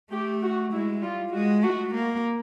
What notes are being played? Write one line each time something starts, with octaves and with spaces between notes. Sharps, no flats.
A3 G4
F#4
G#3 E4
G3 F4
G#3 F#4
A3 F#4
A#3